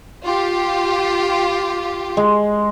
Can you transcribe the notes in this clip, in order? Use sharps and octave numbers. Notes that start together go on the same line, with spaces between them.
F4 G4
G#3